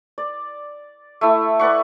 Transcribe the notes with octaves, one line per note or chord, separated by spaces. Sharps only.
D5
A3 E4
B4 D5 F#5 C#6